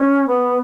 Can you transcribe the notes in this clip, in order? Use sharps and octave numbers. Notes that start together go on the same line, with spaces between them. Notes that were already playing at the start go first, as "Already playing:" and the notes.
Already playing: C#4
B3